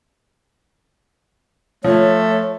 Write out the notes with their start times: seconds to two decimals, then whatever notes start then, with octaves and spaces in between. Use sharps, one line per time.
1.84 F3 A3 C#5